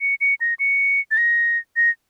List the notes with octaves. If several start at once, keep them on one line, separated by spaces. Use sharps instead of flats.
C#7
C#7
A#6
C#7
A6
A#6
A#6